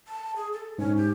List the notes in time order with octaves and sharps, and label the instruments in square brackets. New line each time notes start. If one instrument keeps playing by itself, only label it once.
[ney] A5
G#4
A4
[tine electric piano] G#2 [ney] C#4
[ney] G4